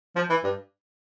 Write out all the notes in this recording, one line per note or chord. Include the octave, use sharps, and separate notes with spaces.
F3
E3
G2